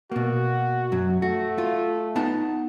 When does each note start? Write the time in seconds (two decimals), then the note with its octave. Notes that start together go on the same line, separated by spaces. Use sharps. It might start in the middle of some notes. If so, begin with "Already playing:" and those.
0.11 B2 A#3 F#4
0.92 F#2 F#3
1.22 A3 F#4
1.58 F4
2.16 B3 D#4 A5